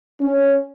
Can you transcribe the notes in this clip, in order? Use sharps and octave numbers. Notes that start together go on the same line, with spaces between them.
C#4